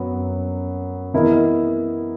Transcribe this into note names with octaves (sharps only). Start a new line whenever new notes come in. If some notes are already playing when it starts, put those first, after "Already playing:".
Already playing: F#2 F#3 B3
E3 B3 E4 A#4 D#5